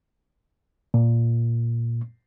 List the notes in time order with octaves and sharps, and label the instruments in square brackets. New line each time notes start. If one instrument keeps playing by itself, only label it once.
[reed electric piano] A#2